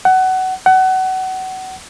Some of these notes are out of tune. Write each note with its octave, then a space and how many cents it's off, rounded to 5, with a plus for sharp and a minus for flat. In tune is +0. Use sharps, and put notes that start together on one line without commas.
F#5 +20
F#5 +25